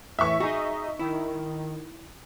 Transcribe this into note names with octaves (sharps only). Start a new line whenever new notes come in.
A2 E3 E5 C#6
D#4 F#4 G#4 D#5
D#3 E4